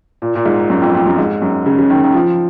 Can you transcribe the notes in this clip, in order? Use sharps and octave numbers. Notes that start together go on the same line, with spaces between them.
A#2
A#2
G#2
F#2
F2
F2
F#2
G#2
F#2
C#3
C#3
D#3
D#3
F3